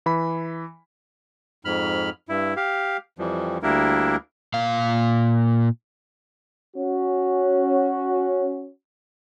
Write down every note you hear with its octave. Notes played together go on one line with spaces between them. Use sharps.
E3 B5
F2 G#2 B5 F6
G2 E4
G4 F5
F2 E3 F3 G3
D2 G3 A#3 D4 E4 A#4
A#2 F5
C#4 F#4